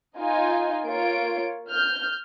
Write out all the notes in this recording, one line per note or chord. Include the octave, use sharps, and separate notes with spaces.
D#4 F4 D#5 G#5
A#3 F4 C#5 D7
F6 G6